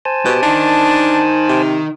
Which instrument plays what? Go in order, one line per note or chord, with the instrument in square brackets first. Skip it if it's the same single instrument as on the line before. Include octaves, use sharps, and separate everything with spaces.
[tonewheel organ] C5 G#5 A5
[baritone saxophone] B2 [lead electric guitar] G4
[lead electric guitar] D#3 D#4 [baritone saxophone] D4
[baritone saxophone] C3